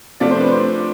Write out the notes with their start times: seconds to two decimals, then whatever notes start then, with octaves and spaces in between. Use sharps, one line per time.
0.20 C3 F3 A3 D4 D5
0.31 C5
0.41 B4
0.51 C5